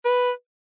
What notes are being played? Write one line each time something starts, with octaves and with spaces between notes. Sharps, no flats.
B4